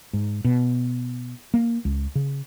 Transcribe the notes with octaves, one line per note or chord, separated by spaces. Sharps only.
G#2
B2
A#3
C#2
C#3